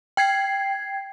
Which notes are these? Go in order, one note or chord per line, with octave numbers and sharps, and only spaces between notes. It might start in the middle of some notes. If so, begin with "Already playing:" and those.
G5 G#6 C7